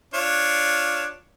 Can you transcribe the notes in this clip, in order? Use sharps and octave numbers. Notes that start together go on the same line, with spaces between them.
D4 F4 C#5